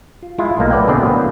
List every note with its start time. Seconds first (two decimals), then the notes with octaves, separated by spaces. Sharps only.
0.23 F4
0.38 G#3 E4 F4
0.58 B1 A3 A#3 D#4
0.71 A4 B4 D5 F#5 G5
0.87 B2 D3 C4 G#4 D5 G5
1.00 F#3 A#3 B3 E4